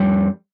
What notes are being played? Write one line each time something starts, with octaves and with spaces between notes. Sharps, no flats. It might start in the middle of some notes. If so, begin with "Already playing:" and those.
Already playing: F2 G3